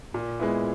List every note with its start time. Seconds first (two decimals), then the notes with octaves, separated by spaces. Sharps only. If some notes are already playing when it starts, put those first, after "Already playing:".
0.14 A#2
0.39 G#3 B3 E4